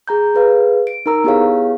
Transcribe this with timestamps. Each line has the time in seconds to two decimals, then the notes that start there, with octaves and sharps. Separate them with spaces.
0.08 G#4 A#5 G6
0.35 G#4 B4 F5
0.87 D7
1.06 D#4 A#4 A#5 E6
1.24 B3 E4 G4 G#4 C#5 F5